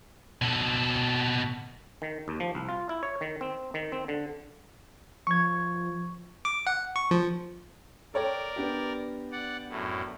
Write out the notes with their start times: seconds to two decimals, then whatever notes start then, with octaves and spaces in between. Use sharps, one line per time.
0.42 B2 A4
2.02 D#3
2.28 D#2
2.40 F3
2.55 C2
2.69 F4
2.89 E4
3.03 C#5
3.21 D#3
3.41 C4
3.74 D#3
3.92 C4
4.08 D3
5.27 F3 C#6 G#6
6.45 D6
6.67 F#5
6.96 C#6
7.11 F3
8.14 A4 A#4 C#5 D5 G5
8.56 B3 D4 G4
9.32 D5 F#5
9.69 F#2 A2